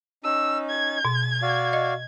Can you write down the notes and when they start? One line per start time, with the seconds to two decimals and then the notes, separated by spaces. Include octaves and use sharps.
0.24 C#4 D#4 E6
0.70 G#6
1.05 B2
1.42 F#4 D5 F5
1.73 D#5